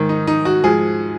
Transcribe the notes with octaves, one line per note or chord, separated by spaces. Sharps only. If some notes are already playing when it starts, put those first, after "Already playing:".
Already playing: G#2 D#3
D#4
D#4
F#4
G#2 F3 G#4